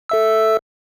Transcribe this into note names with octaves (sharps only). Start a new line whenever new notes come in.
A4 E5 E6